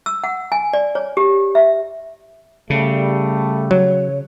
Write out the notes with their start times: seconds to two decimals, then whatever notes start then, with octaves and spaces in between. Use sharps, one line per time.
0.06 E6
0.24 F#5
0.52 G#5
0.73 D5
0.95 C#5
1.17 G4
1.55 E5
2.70 C#3 G3 A3
3.71 F#3 C#5